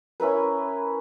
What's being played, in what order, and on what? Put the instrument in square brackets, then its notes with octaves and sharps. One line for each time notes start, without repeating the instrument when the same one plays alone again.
[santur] C#4 E4 A#4 B4